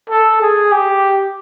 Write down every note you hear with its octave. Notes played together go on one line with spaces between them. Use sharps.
A4
G#4
G4